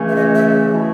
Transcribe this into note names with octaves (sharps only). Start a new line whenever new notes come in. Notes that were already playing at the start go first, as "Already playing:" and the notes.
Already playing: C#2 C#3 E3 A3 C#4
E5
D#5
E5
B2 A3 E4